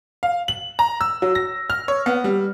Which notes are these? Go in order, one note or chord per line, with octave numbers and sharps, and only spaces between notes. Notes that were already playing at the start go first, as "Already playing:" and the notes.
F5
F#7
A#5
E6
F#3
A#6
F6
C#5
B3
G3